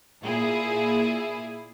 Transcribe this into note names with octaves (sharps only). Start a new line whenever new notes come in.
A#2 E4 G#4